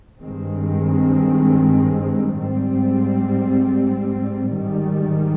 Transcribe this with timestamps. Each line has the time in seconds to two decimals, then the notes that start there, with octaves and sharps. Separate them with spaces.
0.21 G2 D#3 G#3 C4
2.38 G#2 G3 C4
4.54 G#2 D#3 G3